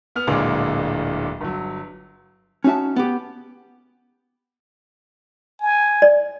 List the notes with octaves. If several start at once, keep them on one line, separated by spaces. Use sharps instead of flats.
B3 F6 F7
D1 D2 A#2 G#3 D4 D6
G1 F#3
C#4 D#4 F#4 E5 A5
B3 G4
G#5
D5